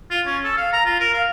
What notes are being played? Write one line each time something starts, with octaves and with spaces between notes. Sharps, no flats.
F4
C#4
A4
F5
A#5
F4
A#4
F5